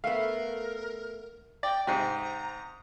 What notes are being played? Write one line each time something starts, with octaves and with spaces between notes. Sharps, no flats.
A3 B3 A#4 F5
D5 G5
G#2 C3 F5 G5 A#5